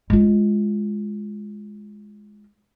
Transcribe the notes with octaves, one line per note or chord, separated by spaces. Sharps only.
G#3 F4